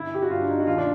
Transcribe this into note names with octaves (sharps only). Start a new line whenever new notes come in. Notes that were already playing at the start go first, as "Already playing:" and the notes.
Already playing: G1 E4
G4
F#4
G2 F4
D4
D#4
F#4
D#2 F4
D4